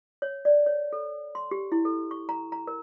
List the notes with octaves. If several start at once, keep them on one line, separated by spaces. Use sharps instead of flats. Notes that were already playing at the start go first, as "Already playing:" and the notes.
C#5
D5
C#5
A4
C6
G4
E4
A4
C#6
A#5
A#5
A#4